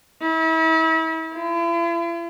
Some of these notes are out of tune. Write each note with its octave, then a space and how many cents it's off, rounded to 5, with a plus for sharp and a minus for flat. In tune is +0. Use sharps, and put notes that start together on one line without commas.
E4 -35
E4 +45